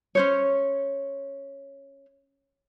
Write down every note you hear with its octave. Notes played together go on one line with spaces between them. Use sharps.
C#4 C5 C#5